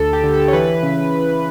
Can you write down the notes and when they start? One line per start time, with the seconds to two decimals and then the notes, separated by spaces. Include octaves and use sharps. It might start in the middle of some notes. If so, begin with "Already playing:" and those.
Already playing: D2 A4
0.13 G4
0.23 D3
0.34 A4
0.48 C#5
0.53 E3 B4
0.83 C#3